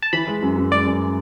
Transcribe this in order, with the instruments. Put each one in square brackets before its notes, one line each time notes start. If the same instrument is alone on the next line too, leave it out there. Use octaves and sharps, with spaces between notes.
[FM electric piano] A5
[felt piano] E3 [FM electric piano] B5
[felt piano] G#3
F#2
F#2
[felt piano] G#3 [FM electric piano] D5
[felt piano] F#2